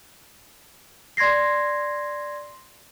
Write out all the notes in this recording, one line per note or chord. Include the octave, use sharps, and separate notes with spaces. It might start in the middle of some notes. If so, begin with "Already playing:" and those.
D5 C6 G#6 A#6 C7